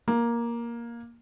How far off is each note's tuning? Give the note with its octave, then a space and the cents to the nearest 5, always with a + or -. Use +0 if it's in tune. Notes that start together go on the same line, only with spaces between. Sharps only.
A#3 +10